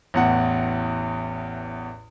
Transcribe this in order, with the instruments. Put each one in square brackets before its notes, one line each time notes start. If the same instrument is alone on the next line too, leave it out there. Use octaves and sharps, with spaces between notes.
[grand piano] A1 E2 F#5